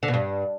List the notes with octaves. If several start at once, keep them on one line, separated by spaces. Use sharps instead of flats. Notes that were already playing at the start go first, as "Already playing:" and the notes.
D3
B2
G2